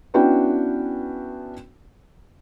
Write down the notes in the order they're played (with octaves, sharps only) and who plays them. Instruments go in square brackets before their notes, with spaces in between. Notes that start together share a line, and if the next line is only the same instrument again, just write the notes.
[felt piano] B3 C#4 D4 E4 F#4 G5